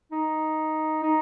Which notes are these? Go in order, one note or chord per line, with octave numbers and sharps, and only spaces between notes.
D#4
D#4